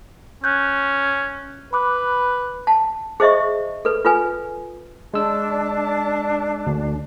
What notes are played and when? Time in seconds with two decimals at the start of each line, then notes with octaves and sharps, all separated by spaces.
0.44 C#4 F#6 G6
1.73 B4 B5 D6 F#6
2.67 A5
3.20 G#4 C5 D#5 E5 C#6
3.85 A4 B4
4.05 F4 A4 B4 G#5
5.14 G#3 D4 A5 E6
6.67 D2